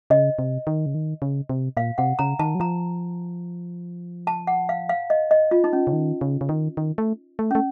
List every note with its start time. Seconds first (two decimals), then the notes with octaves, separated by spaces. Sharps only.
0.10 C#3 D#5
0.39 C3
0.67 D#3
0.86 C#3
0.95 D#3
1.22 C#3
1.49 C3
1.77 A#2 F5
1.98 C3 F#5
2.19 C#3 A#5
2.39 D#3 A5
2.55 F#3
2.60 F3 A#5
4.27 A5
4.47 F#5
4.69 F5
4.89 F5
5.10 D#5
5.31 D#5
5.51 F4
5.64 D#4
5.73 C#4
5.87 C#3
5.93 D#3
6.21 C#3
6.41 C#3
6.49 D#3
6.77 D#3
6.98 A3
7.39 A3
7.51 A3 C#4